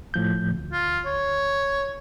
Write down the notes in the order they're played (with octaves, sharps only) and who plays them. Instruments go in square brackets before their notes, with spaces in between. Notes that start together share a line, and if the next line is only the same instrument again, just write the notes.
[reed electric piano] A2 F3 G6
D2
[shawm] F4
C#5